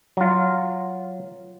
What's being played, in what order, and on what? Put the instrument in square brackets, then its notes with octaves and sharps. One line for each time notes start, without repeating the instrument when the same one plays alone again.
[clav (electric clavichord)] F#3 F4